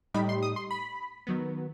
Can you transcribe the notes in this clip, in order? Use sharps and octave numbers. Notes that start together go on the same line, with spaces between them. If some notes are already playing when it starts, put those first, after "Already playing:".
A2 G3 D#4 B5
C6
D#6
C6
B5
D#3 F#3 B3